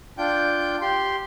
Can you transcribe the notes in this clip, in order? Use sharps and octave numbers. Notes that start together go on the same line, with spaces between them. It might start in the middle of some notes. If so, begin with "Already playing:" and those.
D4 F4 G5 G6
G4 C6